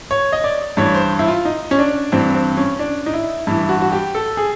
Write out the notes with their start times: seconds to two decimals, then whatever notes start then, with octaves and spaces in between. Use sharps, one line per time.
0.11 C#5
0.32 D#5
0.44 D5
0.77 G2 E3 C#5
0.95 C5
1.19 E4
1.28 F4
1.45 D#4
1.71 C#4
1.79 D4
2.12 G2 E3 C4
2.34 C4
2.57 C#4
2.79 D4
3.06 D#4
3.14 E4
3.47 G2 E3 E4
3.69 F#4
3.81 F#4
3.92 G4
4.15 A4
4.37 G#4